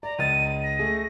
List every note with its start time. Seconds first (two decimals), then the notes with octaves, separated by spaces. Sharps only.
0.03 D5 A#5
0.19 C#2 D#5 A6 D#7
0.64 A#6
0.79 A3 G#4